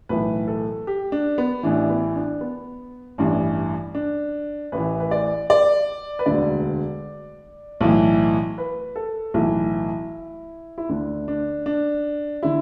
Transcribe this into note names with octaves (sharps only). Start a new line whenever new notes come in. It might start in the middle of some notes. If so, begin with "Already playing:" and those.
B1 A2 E3 B4
A4
G4
D4
B3
A1 A2 E3 D4
B3
D4
B3
A1 G2 E3
D4
A1 A2 E3 B4
B4
D5
D5
B4
E1 D2 D3 D5
B1 A2 E3
B4
A4
B1 A2 E3 E4
E4
D2 D3 D4
D4
D4
D3 E4